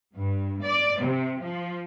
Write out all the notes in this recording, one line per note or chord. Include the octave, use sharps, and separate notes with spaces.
G2
D5
C3
F3